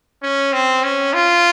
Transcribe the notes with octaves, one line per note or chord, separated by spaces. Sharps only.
C#4
C4
C#4
F4